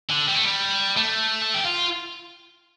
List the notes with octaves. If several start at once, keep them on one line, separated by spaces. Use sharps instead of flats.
D3
G3
A3
G3
A3
A4
G4
F4